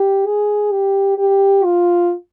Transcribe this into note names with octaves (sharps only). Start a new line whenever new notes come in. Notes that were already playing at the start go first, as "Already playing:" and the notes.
Already playing: G4
G#4
G4
G4
F4